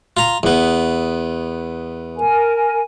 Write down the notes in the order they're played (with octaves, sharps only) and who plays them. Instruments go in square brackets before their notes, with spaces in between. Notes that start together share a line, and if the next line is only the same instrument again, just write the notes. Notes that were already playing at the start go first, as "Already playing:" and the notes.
[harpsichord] F4 A#5
E2 B3
[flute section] A#4 G#5